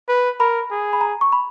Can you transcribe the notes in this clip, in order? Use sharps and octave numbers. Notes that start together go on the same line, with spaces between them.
B4
A#4 B5
G#4
B5
A#5
C#6
B5